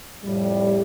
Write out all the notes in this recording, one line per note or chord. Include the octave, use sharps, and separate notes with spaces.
F2 A2 G3